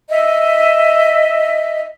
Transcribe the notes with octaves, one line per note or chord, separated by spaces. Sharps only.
D#5 E5